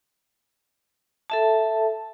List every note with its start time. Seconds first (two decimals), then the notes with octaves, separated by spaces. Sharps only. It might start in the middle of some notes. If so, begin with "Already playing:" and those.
1.30 A4 E5 A5